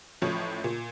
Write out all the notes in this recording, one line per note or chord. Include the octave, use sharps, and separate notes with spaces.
A1 A2 F3 C#5
A#2